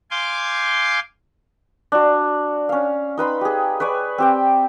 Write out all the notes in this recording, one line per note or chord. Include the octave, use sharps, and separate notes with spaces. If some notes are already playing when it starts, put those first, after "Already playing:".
F5 G#5 C6 D6 G6
D4 F#4
C#4 F5
D#4 B4 B5 C6
G4 G#4
B4 C#5 D5 G#5
C4 G4 G5